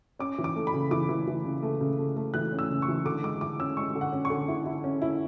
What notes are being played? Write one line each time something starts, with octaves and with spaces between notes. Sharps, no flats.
C#4 D6
E3
D6
A3
B5
C#3
E3 D6
E3
E3
C#3
A3
C#3
A3
A3
E3 F#6
C#4
E6
C#3
C#6
E3
D3 D6
G#3 D6
E4 D6
C#4 E6
G#3 C#6
D3
F#5
C#4
C#6
D3
E4
E4
C#4
E4